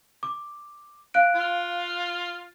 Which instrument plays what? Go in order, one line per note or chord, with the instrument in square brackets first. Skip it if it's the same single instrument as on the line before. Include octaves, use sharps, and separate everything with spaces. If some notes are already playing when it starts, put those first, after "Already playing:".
[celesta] D6
F5 F#6 D7
[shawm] F4